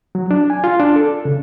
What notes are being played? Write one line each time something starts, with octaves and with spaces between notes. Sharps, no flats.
F#3
D4
G#5
F4
D4
A4
C#3